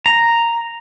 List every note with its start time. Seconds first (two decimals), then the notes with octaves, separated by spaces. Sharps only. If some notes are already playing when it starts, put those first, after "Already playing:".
0.06 A#5